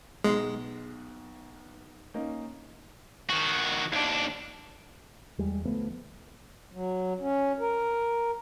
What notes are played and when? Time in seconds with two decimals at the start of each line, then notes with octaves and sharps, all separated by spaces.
0.24 B1 B2 G#3 C7
2.14 A#3 C#4 D#4
3.30 D#3 F#4
3.92 D#2 D4
5.38 E2 G3 G#3
5.65 D2 F3 A3 B3
6.73 F#3
7.20 C#4
7.60 A#4